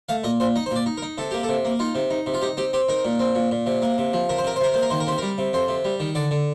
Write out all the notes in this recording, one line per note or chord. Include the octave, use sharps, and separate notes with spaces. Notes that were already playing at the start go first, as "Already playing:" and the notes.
A3 F5
A#2 D#5
A#2 C5
D#4 D#5
C5
A#2 D5
D#4
A#4
D#4
C3 A4
A#3 G4
A4
C3
A#3
D#4 F4
C3
D#4
C3
F4
D#4 G4
C4 G4
C4 G4
D#4 A#4
A#2
C4
A#2
A#2
C3
A#3
C3
F3
C3 A#4
C5
C3 A#4
C5
C3 A#4
A#3 C5
A#4
D#3 C5
A#4
C3 C5
G3 A#4
C3
F2 C5
C3
G3
D#3
D3 D5
D3